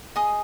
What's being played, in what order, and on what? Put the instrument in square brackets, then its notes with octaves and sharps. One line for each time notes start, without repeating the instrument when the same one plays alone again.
[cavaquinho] G#4 D#5 D#6